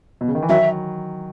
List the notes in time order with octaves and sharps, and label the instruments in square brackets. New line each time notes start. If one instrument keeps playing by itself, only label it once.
[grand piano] B2
C#3
D#3
E3
[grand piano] D#3 F#3 [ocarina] E5